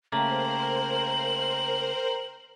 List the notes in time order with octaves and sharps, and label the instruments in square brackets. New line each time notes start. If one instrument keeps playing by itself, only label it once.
[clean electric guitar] C#3 A3 A#3 [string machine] A#4 C5 [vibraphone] G5 A#5 [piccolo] F#7